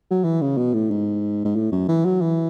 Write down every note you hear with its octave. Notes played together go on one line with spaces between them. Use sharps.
F#3
E3
C#3
B2
A2
G#2
G#2
A2
F#2
E3
F#3
E3